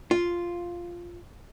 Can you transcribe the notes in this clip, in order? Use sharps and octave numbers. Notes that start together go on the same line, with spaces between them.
F4